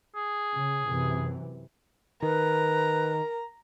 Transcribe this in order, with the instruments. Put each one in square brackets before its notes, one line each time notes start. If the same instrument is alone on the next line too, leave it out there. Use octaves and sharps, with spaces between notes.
[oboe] G#4
[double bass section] C#3
F#2 C3 E3
[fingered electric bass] D#3 [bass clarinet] A#4 [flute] B4 [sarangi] A#5